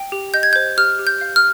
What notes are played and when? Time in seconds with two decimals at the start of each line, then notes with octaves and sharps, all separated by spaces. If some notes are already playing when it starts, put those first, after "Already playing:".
Already playing: G5
0.12 G4
0.34 D#5 G6
0.43 G#6
0.53 G6
0.56 C5
0.77 G4 F6
0.99 G4
1.07 G6
1.21 F5
1.36 F6